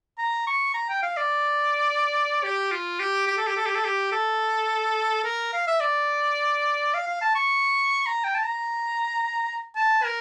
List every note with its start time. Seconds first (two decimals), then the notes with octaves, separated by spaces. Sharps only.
0.18 A#5
0.47 C#6
0.74 A#5
0.89 G5
1.03 F5
1.17 D5
2.44 G4
2.71 F4
3.00 G4
3.27 G4
3.37 A4
3.47 G4
3.57 A4
3.66 G4
3.75 A4
3.85 G4
4.12 A4
5.24 A#4
5.53 F5
5.67 E5
5.80 D5
6.94 F5
7.07 F5
7.21 A5
7.35 C#6
8.06 A#5
8.24 G5
8.35 A5
8.44 A#5
9.76 A5
10.04 A#4